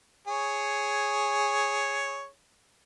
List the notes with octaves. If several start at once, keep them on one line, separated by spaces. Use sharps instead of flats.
G#4 C#5